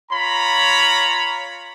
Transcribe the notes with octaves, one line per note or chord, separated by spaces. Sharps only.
F4 C#5 A#5 B5